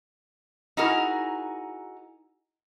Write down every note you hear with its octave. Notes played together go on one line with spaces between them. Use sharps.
D#4 E4 F#4 G#4 A#4